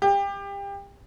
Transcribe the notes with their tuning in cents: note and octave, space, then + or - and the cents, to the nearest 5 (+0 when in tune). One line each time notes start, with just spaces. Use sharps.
G4 +30